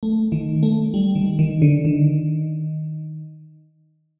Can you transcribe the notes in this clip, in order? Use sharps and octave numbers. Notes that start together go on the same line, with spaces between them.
A3
D#3
A3
G3
D#3
D#3
D3
D#3